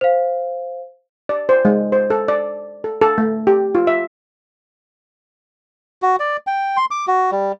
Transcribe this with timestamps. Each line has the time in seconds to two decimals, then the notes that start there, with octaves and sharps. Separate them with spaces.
0.01 C5 F5
1.29 D5
1.49 C5
1.65 G#3
1.92 C5
2.10 A4
2.28 D5
2.84 A4
3.01 A4
3.18 A3
3.47 G4
3.75 F4
3.87 E5
6.02 F#4
6.20 D5
6.47 G5
6.77 C6
6.91 D6
7.07 F#4
7.32 G3